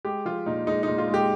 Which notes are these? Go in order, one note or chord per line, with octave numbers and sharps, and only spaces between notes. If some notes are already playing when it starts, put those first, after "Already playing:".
G#3 G4
F3 F4
A#2 D#4
G#3 D#4
A#2 D#4
F4
G#3
G4